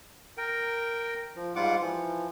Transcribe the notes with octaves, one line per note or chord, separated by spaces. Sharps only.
A#4 G5
F3
G#2 G3 F4 F#5 D6
E3 F3